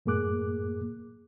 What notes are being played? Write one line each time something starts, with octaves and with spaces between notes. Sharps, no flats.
F#2 A2 A#3 G#4 D6 F#6